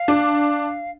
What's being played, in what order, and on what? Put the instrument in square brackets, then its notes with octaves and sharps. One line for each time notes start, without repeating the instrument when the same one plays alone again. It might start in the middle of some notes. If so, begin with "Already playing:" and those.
Already playing: [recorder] F5
[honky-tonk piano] D4